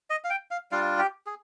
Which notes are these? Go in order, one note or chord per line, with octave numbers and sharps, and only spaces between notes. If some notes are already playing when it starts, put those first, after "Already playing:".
D#5
F5
G5
F5
G3 D4 F4 F5
G4
G#4